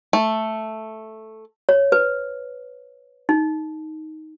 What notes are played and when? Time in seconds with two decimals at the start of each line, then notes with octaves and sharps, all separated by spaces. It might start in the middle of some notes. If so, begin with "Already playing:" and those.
0.13 A3
1.69 C#5
1.92 B4
3.29 D#4